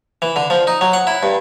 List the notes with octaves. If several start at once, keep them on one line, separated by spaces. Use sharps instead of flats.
E3
D3
F3
D#4
F#3
F#5
E4
G2